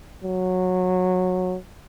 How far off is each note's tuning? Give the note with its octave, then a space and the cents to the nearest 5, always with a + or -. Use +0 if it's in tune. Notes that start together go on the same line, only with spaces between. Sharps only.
F#3 -15